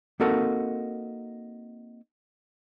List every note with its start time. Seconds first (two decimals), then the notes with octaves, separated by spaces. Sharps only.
0.20 A#3 C4 D#4 F#4 A4 A#4